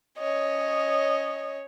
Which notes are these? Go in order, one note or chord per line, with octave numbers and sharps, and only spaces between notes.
C#4 C#5 D#5